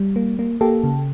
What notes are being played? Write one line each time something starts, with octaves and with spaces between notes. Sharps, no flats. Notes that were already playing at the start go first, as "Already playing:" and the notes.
Already playing: G3
A#3
A#3
A#3 G4 A4
C#3